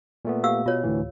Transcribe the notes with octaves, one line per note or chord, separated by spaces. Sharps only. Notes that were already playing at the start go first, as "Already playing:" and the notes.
A#2 A3 B3
G4 F5 E6
B2 F4 C#5
D2 A2 E3